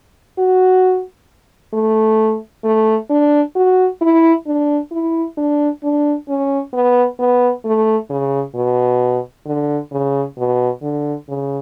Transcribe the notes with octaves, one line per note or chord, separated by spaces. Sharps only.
F#4
A3
A3
D4
F#4
E4
D4
E4
D4
D4
C#4
B3
B3
A3
C#3
B2
D3
C#3
B2
D3
C#3